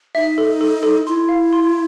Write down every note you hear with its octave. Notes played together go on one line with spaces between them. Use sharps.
D#4 E5
A4
A4
A4
E4 C6
F5
C6